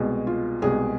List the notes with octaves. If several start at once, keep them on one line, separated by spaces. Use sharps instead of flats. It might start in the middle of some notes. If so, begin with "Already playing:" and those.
Already playing: C2 B2 G#3
F4
C2 B2 G#3 G#4